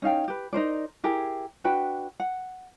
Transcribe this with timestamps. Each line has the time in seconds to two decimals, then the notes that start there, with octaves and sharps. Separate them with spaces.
0.02 C#4 D#4 F5 G5
0.28 G4 B4
0.53 D#4 A#4 C5 D5
1.04 E4 G4 G#4 A#4
1.64 D4 F#4 B4 G5
2.20 F#5